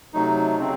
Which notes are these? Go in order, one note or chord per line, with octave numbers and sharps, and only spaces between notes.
C3 F#3 A3 D#4
C#3 F#3 C4